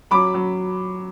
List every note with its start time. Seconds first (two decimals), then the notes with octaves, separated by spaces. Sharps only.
0.11 F#3 B5 D6
0.34 F#3